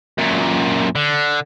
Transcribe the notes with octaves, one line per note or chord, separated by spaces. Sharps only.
F#2 A#2
D3